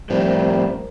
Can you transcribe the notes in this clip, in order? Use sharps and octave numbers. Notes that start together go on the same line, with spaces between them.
A2 F3 G3 C4 A#4